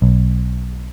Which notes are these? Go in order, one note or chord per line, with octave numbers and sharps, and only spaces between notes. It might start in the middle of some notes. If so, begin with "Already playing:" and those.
B1